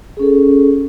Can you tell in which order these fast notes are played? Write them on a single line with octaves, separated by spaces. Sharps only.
G#4 C#4 A4